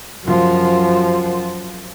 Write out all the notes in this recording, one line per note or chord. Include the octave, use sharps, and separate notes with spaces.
F#2 F3